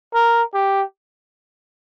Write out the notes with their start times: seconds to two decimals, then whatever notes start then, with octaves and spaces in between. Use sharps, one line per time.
0.14 A#4
0.54 G4